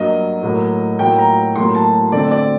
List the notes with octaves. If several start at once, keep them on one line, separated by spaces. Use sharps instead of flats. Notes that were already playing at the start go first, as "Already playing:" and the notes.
Already playing: G2 F#3 A#3 D#5
A2 F#3 A#3
A2 F#3 A#3 G5
A#5
A2 F#3 A#3 C6
A5
D3 A3 C4 D5
D5